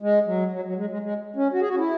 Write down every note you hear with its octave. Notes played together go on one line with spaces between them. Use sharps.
G#3
F#3
F#3
F#3
G#3
G#3
G#3
C#4
F#4
G#4
F#4
C#4
E4